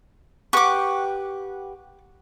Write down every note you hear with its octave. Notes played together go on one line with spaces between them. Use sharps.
G4 B4 F#5 C#6 D6